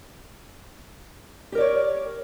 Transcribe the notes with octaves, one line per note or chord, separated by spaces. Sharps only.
G4 A#4 C#5 D5